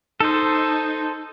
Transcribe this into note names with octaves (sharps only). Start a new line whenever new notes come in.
D#4 A4 C5